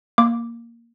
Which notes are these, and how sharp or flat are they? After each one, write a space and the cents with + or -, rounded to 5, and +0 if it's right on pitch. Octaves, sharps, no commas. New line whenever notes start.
A#3 +0 F5 +0 D6 +0